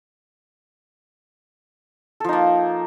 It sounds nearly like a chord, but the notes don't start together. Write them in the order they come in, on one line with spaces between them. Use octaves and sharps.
A4 F3 D#4 A#3